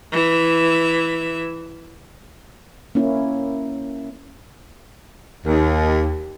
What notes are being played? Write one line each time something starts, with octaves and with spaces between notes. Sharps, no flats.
E3 E5
A#3 C#4 E4
D#2